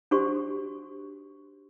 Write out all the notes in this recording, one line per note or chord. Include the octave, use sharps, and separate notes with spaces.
D4 F#4 G4 C5 C6 C#6